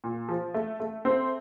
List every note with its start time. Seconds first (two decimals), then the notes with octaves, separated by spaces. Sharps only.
0.04 A#2
0.29 F3
0.54 A3
0.80 A3
1.05 C4